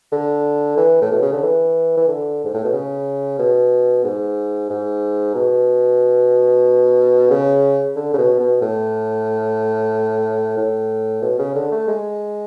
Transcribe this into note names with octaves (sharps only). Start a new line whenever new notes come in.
D3
E3
A2
B2
C#3
D3
E3
E3
D3
G#2
A2
B2
C#3
B2
G#2
G#2
B2
C#3
D3
C#3
B2
B2
A2
A2
B2
C#3
D3
A3
G#3